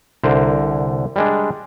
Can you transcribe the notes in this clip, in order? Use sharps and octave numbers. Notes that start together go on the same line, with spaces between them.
C2 D3 A#4 C5
G3 G#3 D4